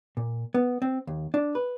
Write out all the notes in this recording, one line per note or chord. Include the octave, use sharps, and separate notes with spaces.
A#2
B3
C4
D#2
D4
B4